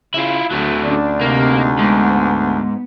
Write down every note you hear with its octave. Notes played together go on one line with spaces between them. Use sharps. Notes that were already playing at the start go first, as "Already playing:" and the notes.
C#3 E4 F4
D2 F#3 A3
C#4 D4 D5
C3 A#3 D#4
G#2 B3